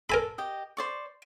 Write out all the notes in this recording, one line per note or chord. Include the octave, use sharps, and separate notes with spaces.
A4 A#4 G#5 B5
G4 D#5
C5 D5 C#6